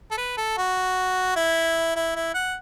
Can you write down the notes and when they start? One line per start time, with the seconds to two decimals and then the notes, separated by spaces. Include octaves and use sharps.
0.11 A4
0.17 B4
0.37 A4
0.57 F#4
1.36 E4
1.96 E4
2.16 E4
2.34 F#5